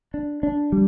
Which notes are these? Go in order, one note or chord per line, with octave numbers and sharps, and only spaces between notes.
D4
D4
G3